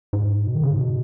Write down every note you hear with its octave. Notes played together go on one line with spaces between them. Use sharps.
G#2
B2
D#3
C#3
G#2
B2